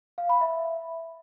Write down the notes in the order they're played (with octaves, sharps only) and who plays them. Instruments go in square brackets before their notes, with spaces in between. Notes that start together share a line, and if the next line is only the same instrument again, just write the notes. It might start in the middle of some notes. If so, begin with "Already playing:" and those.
[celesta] F5
B5
E5